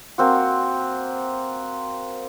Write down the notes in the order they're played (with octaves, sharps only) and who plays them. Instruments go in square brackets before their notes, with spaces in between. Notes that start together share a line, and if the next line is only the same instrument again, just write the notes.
[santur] A#3 C4 F#4